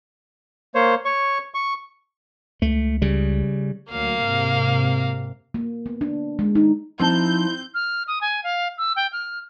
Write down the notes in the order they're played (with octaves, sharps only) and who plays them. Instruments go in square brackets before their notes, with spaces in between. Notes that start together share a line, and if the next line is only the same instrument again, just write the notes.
[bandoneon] A#3 C5 C#5
C#5 C#6
C#6
[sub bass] C#2 [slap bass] A3
[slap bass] C#3 G3
[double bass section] D2 F#3 [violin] A#3 F5
[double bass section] G#2 C3
[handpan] A#3
B3
D4
G#3
D#4
[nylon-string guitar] F3 D#4 A5 [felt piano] C4 [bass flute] E4 [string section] G6
[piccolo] F6
D#6
G#5
F5
E6
G5
F6